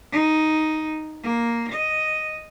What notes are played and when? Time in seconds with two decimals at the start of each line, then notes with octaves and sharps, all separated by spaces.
0.12 D#4
1.23 A#3
1.73 D#5